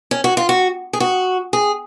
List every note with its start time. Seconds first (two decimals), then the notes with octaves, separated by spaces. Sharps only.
0.11 C#4
0.24 F#4
0.37 F4
0.49 F#4
0.93 G#4
1.00 F#4
1.53 G#4